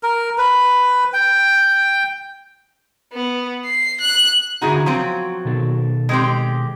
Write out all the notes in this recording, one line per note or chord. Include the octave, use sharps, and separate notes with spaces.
A#4
B4
G5
B3
C7
F#6
D3 D#4 E4 F#4 G#4 F#5
F3 F#3 C4 F5 A#5
B2 D#3 A4
G#3 C4 G4